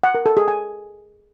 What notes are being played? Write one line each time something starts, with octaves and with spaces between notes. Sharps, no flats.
F#5
A#4
A4
G#4
G#5